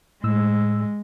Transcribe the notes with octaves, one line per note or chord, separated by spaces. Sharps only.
A2 G#3 E6